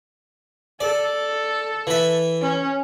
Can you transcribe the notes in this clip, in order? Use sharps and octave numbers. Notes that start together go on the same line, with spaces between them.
A4 D5
E3 E5
C#4